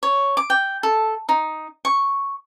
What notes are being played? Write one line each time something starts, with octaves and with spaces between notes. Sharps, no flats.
C#5
D6
G5
A4
D#4
C#6